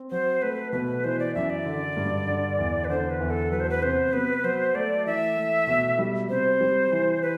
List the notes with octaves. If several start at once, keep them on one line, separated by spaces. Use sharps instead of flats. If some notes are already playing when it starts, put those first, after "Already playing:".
Already playing: C4
F#3 C5
A3 B4
B2 B4
E3 C5
D5
F#2 E5
D5
D3
G2
D3
E2
B4
D3 C5
B4
E2
A4
F#3 B4
C5
B4
C3 C5
B3 B4
F#3 C5
A3 D5
E3 E5
A3
B2
G3
C3 C5
G3
E3
B4